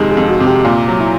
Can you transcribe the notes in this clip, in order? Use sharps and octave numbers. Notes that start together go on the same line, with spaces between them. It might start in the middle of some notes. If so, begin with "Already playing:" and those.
Already playing: F2 C3 D#3 G#3 G4 G#4
G#4
F2
F#4
C3
G4
A#2 F4
F#3
E4